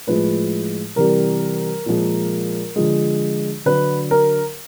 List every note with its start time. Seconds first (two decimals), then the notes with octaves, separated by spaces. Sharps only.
0.07 A2 F3 G#3 B4
0.96 C3 E3 G3 A#4
1.86 A#2 F3 G#3
2.76 D3 F3 G#3
3.66 D3 F#3 B4
4.11 A#4